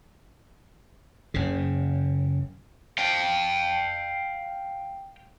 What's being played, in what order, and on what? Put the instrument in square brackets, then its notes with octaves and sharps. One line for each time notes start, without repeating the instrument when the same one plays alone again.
[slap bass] F#1 C#3
[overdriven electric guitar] F5 G5